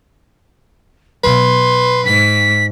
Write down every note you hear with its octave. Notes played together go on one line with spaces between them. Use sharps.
B2 F#3 B4 C6
G#2 B6